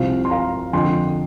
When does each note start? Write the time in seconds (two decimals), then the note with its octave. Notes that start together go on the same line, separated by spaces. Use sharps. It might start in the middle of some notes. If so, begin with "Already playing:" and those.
Already playing: C2 C3 F3 C5 F5
0.25 C6
0.30 F5 A#5
0.73 F2 D3 F3 G5 C6